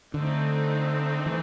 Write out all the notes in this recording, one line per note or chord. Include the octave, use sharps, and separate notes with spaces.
D3 A3 C4 D#4
E3